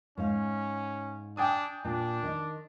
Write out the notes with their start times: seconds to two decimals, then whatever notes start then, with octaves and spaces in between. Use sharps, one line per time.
0.18 G#2 C#4 F5
1.37 D4 G5 G#5 D#6
1.85 A#2 D4
2.23 D#3 D#4